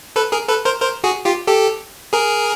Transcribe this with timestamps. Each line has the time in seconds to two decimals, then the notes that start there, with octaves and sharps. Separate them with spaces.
0.16 A4 B4
0.32 G#4 A#4
0.48 A4 B4
0.65 A#4 C5
0.81 A#4 C5
1.04 F#4 G#4
1.25 F4 G4
1.47 G4 A4
2.13 G#4 A#4